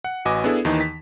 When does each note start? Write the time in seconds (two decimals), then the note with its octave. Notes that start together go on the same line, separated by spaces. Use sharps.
0.04 F#5
0.25 A1 F#4 B4 D#5 G#5 D6
0.44 B3 D4 E4 G#4 A4
0.65 D#2 D#3 E3 D#4
0.81 B6